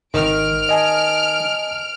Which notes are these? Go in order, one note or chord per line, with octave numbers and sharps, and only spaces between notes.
G#1 D#3 F6 D7
D#5 G#5 A5